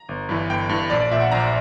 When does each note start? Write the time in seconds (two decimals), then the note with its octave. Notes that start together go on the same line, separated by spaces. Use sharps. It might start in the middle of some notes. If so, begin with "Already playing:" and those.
Already playing: A#5
0.09 G1
0.29 G2 E3
0.50 G1 G5
0.69 G2 E3
0.90 A#1 D5
1.00 D5
1.11 A#2 E5
1.21 F#5
1.31 A#1 A#5